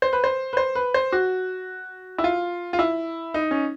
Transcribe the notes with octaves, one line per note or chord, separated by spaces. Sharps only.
C5
B4
C5
B4
C5
B4
C5
F#4
E4
F4
F4
E4
D#4
C#4